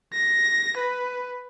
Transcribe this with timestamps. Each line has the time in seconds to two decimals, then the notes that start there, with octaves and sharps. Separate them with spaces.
0.14 A#6
0.77 B4